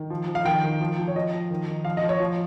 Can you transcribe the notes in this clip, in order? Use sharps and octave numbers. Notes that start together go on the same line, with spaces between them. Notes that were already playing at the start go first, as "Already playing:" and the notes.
Already playing: D#3
F3
F3
F5
D#3 G5
D#3
F3
F3
C#5
F3 D#5
F3
D#3
D#3
F3 F5
D#5
F3
C#5
F3